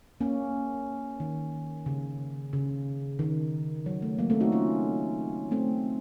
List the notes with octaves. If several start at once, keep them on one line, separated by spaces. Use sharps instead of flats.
A#3 C#4
D#3
C#3
C#3
D#3
F#3
A3
F#3 A#3
A3 C4
D#4 F#4
C#4 F4
A3 C4